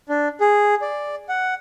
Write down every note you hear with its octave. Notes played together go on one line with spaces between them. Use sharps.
D4
G#4
D5
F#5